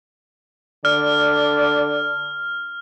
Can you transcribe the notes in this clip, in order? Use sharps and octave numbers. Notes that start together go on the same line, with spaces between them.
D3 D5 F6